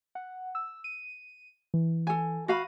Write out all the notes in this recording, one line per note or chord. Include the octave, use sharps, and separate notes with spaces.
F#5
E6
D#7
E3
A4 G#5
F#4 F5 B5 A#6 D#7